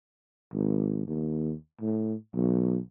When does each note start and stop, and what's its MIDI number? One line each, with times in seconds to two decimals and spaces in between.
0.54 1.02 32
1.07 1.53 39
1.81 2.14 45
2.35 2.78 35